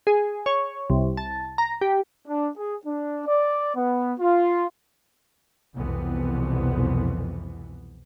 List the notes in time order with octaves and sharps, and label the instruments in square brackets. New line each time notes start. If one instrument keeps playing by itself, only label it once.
[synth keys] G#4
C#5
C2
A5
A#5
G4
[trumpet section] D4
G#4
D4
D5
B3
F4
[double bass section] C2 F2 B2 E3 B3